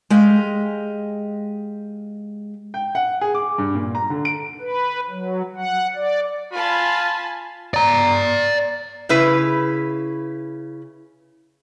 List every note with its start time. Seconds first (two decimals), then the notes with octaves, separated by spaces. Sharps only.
0.10 G#3 G4 D#5 F5
2.74 G5
2.95 F#5
3.21 G#4
3.35 D6
3.58 G2
3.75 A#2
3.95 A#5
4.10 D3
4.25 D7
4.61 B4
5.10 F#3
5.56 F#5
5.95 D5
6.53 F4 G#5 A5 B5
7.74 D5 A#5
9.09 C#3 E4 B4